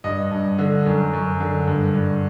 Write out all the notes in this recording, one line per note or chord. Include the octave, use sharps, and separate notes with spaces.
G2 D#5
G2
D3
F#2
F#2
D3
G2
G2